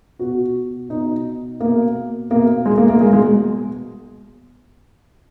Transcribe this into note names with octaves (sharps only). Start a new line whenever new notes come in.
B2 F#4
B2 D#4
B2 A#3
B2 A#3
G#3
A#3
A#3
B2 G#3
G#3